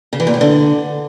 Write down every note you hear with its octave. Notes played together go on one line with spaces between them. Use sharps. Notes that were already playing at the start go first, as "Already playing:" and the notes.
C#3
E3
A#2
A2
D3